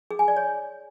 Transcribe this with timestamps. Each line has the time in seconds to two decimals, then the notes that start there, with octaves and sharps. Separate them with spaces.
0.11 G#4
0.19 G#5
0.28 D5
0.37 C#5